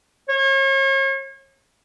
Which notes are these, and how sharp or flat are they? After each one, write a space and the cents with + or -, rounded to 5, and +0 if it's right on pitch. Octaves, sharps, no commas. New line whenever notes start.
C#5 -40